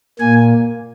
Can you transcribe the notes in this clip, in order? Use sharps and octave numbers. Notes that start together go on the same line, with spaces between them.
A#2 A#3 G#5